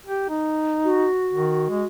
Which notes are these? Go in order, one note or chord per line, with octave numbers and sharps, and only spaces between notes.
G4
D#4
F#4
D#3
G#3